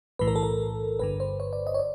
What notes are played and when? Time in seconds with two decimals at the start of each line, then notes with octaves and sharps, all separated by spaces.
0.19 B1 A2 E3 B4
0.28 A#4
0.36 A4
0.43 A#4
0.99 G1 G2 D3 B4
1.20 C5
1.40 C#5
1.53 D5
1.67 D#5
1.74 C#5
1.79 D5